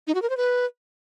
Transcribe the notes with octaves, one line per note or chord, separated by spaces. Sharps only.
D#4
F#4
A#4
C5
B4